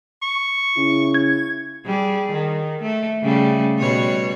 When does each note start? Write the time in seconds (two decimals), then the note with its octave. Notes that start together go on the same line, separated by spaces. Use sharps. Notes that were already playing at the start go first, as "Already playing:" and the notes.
0.22 C#6
0.77 C#3 E4
1.14 G#6
1.86 G3 G#4
2.32 D#3
2.82 A3
3.23 C#3 G3 A3
3.79 B2 G3 C#5